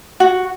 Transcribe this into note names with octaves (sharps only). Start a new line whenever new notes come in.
F#4